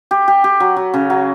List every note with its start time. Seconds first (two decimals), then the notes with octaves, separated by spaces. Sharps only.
0.11 G4
0.28 G4
0.44 G4
0.60 F#3
0.77 F#3
0.94 C#3
1.10 F#3